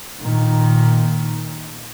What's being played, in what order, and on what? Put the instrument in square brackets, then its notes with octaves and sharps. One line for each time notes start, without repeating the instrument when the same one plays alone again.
[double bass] A#2 D#3